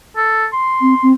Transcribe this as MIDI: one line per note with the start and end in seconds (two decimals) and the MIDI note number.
0.16 0.46 69
0.53 1.09 84
0.81 0.94 60
1.03 1.12 60